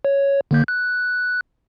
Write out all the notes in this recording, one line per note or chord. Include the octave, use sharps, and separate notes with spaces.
C#5
D3 A#3 G6
F#6